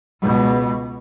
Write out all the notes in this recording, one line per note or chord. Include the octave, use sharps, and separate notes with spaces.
C#2 B2